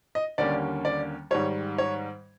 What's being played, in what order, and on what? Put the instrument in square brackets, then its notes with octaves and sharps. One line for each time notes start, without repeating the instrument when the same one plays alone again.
[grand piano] D#5
D#2 D3 G3 A#3 C#4 D5
D5
G#2 D#3 G3 C#5
C#5